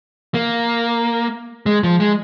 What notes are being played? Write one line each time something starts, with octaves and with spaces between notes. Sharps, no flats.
A#3
G#3
F3
G#3